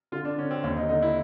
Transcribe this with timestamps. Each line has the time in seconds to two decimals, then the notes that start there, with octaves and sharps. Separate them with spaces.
0.12 D3 F4
0.25 D4
0.38 D3 C#4
0.51 C4
0.63 D#2 C#4
0.77 D#4
0.89 D3 D#4
1.02 E4